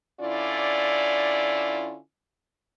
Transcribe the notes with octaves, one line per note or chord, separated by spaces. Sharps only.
D3 C#4 E4 F4 D5